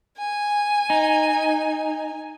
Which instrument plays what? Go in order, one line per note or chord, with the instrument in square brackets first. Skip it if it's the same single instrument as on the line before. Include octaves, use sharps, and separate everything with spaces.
[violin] G#5
[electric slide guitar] D#4